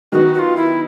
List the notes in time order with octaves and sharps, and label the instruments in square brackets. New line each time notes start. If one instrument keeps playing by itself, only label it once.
[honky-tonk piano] D#3 F#3 B3 D#4 [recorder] F#4
[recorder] F#4
F4
E4